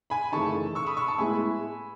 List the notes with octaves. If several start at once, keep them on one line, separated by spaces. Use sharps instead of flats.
G#5 B5
F#2 C#3 E3 A3 D#4 A5 C#6
C#6 E6
B5 D#6
C#6 E6
A5 C#6
A2 G#3 B3 E4 G#5 B5